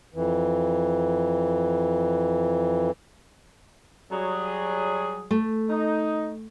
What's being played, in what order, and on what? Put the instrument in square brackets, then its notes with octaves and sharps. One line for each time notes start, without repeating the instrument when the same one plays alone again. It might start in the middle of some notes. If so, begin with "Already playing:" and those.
[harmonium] F2 E3
[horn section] F#3 G3 G#4
[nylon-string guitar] A3
[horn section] D#4